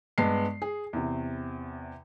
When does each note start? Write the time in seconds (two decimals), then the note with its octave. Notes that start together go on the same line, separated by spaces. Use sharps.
0.18 G2 G#3 B3 C7
0.62 G#4
0.93 E2 C3